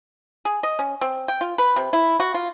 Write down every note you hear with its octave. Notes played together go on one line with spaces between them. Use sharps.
G#4
D#5
C#4
C4
G5
F4
B4
C3
E4
F#4
F4